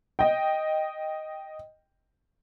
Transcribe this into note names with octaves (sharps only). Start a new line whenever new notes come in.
D#5 G5